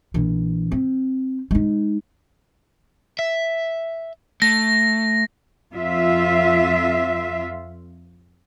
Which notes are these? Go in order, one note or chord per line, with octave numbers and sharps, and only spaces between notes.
A#1 E3
C4
G#3 D#4
E5
A3 A#6
F2 F4 E5